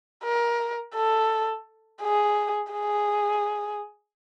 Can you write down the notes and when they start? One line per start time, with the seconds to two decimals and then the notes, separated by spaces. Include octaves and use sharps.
0.24 A#4
0.95 A4
2.02 G#4
2.73 G#4